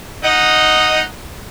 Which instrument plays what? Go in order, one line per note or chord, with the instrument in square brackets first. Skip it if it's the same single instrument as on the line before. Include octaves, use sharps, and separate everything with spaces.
[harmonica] D#4 D#5 F#5